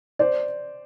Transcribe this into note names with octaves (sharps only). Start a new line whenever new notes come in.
C5 D5